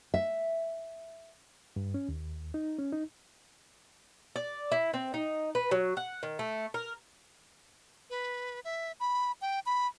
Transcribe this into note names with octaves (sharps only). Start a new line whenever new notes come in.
E5
G2
C#4
D#2
D#4
C#4
D#4
D5
E4
C4
D#4
B4
F#3
F#5
D#3
A3
A#4
B4
E5
B5
G5
B5